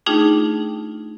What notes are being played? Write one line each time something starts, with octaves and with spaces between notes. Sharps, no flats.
A3 D4 D#4 F4 G#4 G5